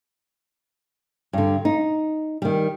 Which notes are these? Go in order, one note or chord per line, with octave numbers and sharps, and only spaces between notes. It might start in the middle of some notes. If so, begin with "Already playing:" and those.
G2 D3
D#4
D#3 G3